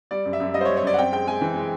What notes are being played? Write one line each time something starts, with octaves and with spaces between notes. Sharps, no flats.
G3 D5
F#2
E5
F#2
G3 D#5
C5
C#5
G3
C#5
F#2 D5
F#5
C4 G5
G#3 G5
G#3 G#5
E3
G#3